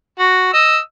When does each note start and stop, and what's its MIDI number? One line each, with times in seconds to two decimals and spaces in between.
0.19 0.49 66
0.54 0.79 75
0.54 0.79 88